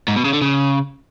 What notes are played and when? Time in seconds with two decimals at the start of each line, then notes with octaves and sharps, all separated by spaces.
0.08 G#2
0.16 B2
0.25 C#3
0.33 D3
0.41 C#3